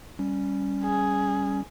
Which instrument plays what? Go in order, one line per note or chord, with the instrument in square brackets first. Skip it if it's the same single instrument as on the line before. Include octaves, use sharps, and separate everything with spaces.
[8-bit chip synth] G3 C#4
[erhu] G#4